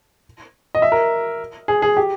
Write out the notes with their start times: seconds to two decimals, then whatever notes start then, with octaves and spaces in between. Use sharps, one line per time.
0.75 D#5
0.82 E5
0.92 A#4
1.68 G#4
1.82 G#4
1.97 G4